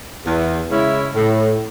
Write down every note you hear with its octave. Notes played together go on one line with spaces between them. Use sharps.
E2
C#3 G#3 C#4 E4
A2